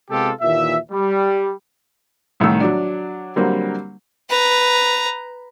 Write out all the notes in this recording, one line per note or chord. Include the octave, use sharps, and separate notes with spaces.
C3 G#3 B3 F4 G4 A4
D#2 A#2 E3 E5
G3
C2 A2 D#3 E6
F#3 D4
D3 F#3 G3 A#3 C4
B4 A#5